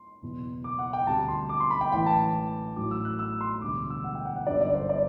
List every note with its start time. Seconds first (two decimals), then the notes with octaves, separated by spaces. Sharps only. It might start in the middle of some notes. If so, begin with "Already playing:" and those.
Already playing: C6
0.22 F#1 E2 B2
0.64 D6
0.79 F#5
0.93 G5
1.07 D2 C3 G3 A5
1.28 C6
1.49 D6
1.60 C6
1.70 B5
1.81 G5
1.92 A1 A2 E3 G5
2.06 A5
2.76 A1 A2 F#3 D6
2.91 E6
3.05 F#6
3.19 E6
3.41 C6
3.62 E1 D2 D3 G3 D6
3.90 E6
4.04 F#5
4.15 G5
4.25 F#5
4.36 F#5
4.47 G1 F#2 D3 G3 D5
4.61 D5
4.75 C5
4.89 D5